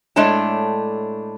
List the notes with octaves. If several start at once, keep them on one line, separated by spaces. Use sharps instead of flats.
A2 G#3 A3 D4 C#5 A5